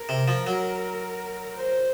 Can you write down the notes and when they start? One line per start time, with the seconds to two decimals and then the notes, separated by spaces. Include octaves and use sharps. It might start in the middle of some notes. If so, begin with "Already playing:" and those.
Already playing: A#4
0.09 C3
0.28 F3
0.47 F#3
1.56 C5